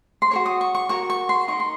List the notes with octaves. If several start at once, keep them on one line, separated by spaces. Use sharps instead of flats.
C6
F#4 A#4 C#5 C#6
D#6
C#6
C#6
F#4 A#4 C#5 C#6
C#6
C6
D#4 A#4 D#5 C#6
C6